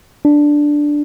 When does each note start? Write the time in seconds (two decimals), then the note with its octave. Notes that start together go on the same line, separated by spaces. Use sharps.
0.25 D4